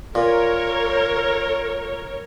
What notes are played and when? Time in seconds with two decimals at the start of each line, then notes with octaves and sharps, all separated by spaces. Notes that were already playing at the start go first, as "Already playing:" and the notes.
0.15 A#2 A#4 C#5